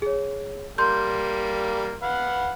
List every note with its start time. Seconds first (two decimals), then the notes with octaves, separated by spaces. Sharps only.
0.02 G#4 C#5
0.78 G3 A#3 C6 G6
2.03 B4 F5 F#5